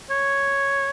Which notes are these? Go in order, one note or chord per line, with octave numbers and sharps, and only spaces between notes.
C#5